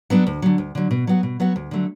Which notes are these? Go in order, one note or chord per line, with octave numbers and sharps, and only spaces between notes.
F#3 B3 D4
D2
D3 F#3
D2
D3 F#3
B2
F#3 B3 F#4
B2
F#3 B3 F#4
D2
D3 F#3 A3